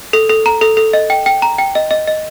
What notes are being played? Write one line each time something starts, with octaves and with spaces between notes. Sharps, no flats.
A4
A4
A#5
A4
A4
D#5
G5
G5
A#5
G5
D#5
D#5
D#5